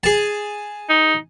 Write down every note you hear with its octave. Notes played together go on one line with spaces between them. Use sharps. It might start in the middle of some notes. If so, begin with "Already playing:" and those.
G#4 A5
D#4